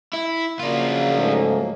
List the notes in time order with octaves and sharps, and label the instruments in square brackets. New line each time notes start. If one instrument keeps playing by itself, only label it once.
[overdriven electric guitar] E4
[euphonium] C#3 [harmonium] F3 F#3 A#3 [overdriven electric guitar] D4 F4
[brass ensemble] G#2 A3